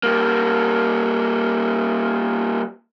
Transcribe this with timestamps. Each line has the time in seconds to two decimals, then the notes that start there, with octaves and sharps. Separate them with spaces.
0.03 G3 A#3